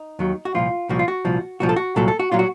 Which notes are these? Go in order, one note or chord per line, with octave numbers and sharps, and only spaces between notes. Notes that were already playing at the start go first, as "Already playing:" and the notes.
Already playing: D#4
D#2 D#3 F#3
F#4
C2 A#2 F3 F4
C2 A#2 F3 F#4
F4
F#4
C2 A#2 F3
C2 A#2 F3 F#4
A4
F#4
C2 A#2 F#3 A4
A4
F#4
A#2 F#3 F4
F#4